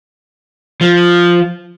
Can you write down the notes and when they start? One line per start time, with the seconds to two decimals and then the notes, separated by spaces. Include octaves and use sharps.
0.81 F3